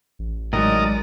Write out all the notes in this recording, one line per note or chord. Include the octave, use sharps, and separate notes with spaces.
A1
A2 D#3 F#3 G#3 A#4 D5 D#5